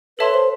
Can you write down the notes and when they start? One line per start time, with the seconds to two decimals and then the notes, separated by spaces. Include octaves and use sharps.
0.18 A4 B4 C#5 E5 A5 C6
0.34 C5